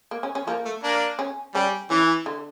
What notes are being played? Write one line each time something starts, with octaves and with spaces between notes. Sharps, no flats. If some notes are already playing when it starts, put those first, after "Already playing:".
A#3
C#4
C#4
F3 A#3
A3
A#3 D4
C#4
G3 C#4
E3 C#4
D3